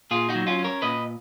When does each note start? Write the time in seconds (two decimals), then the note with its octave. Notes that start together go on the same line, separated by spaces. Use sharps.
0.11 A#2 F4 G#4
0.29 D#4 F#4
0.35 F#3
0.47 C#4 F4
0.59 C#4
0.64 A#4 C#5
0.82 A#2 B4 D#5